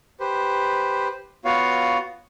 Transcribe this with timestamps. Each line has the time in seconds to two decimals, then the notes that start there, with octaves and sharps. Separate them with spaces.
0.20 G4 B4 C5
1.45 B3 F4 F#4 C#5 F5